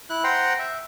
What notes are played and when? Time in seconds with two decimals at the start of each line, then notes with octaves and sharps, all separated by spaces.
0.10 E4 F#6
0.24 C5 F#5 G5 A#5 C6
0.59 E5